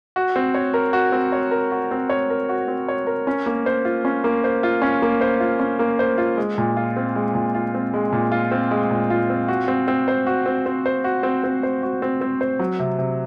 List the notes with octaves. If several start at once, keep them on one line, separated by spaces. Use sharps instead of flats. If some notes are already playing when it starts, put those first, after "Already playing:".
F#4
C4
C#5
A#4
F#4
C4
C#5
A#4
F#4
C4
C#5
A#4
F#4
C4
C#5
A#4
C#4
A#3
C5
F4
C#4
A#3
C5
F4
C#4
A#3
C5
F4
C#4
A#3
C5
F4
G#3
A#2
F4
C4
G#3
A#2
F4
C4
G#3
A#2
F4
C4
G#3
A#2
F4
C4
F#4
C4
C4
C5
F#4
C4
C4
C5
F#4
C4
C4
C5
F#4
C4
C4
C5
F#3
C3
C3